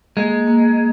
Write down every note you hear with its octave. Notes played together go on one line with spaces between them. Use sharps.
G#3 A#3
A#3